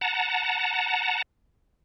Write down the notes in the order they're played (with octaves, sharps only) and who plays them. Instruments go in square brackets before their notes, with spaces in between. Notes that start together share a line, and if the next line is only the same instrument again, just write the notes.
[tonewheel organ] F#5 A5 A#5